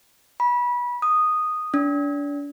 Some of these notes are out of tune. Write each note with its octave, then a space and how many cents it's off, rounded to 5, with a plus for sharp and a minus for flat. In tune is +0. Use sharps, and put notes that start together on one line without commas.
B5 -25
D#6 -5
D4 -35